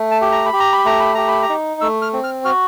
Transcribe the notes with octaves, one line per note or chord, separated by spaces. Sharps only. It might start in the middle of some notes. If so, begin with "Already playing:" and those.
Already playing: A3
A5
G4
A#5
B5
G4
A#5
B5
A3 A#5
B5
G4 A#5
B5
A#5
D#4
A3 E6
F6
C4
F6
F#4 F6